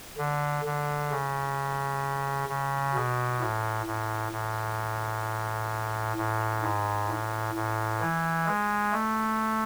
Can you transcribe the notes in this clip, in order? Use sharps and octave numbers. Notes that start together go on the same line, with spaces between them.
D3
D3
C#3
C#3
B2
A2
A2
A2
A2
G#2
A2
A2
E3
G#3
A3